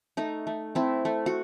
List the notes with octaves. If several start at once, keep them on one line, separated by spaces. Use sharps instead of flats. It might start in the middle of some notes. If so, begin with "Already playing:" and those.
A3 D#4
A3
A3 C4 E4
A3
F#4